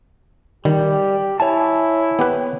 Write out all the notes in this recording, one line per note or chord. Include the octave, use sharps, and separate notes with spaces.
D#3 G3 G4
E4 C#5 G#5 A5
B3 G4 B4